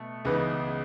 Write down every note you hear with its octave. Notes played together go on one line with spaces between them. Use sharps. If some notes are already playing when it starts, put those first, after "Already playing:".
Already playing: B2 A3
C#2 C#3 E3 B3 D#4